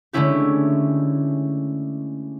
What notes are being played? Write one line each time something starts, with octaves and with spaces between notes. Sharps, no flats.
D3 G#3 A3 C#4 E4 G4